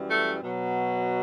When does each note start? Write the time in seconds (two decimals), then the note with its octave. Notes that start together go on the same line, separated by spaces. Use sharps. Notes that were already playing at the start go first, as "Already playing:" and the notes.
Already playing: F#2 E3 G3
0.09 A3
0.42 B2 F#3